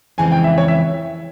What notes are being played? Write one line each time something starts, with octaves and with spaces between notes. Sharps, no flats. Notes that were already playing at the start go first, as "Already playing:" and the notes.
F2 C#3 E3 G#3 C4 G#5
G5
E5
C#5
E5